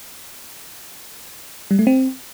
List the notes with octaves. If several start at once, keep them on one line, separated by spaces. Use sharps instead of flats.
G3
A3
C4